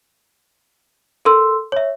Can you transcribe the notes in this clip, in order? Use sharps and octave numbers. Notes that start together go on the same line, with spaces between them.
A4 A#4 C6 E6
C#5 E5